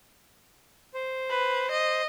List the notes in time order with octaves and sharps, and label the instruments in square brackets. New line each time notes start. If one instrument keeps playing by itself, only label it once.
[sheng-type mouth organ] C5
[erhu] B4
D#5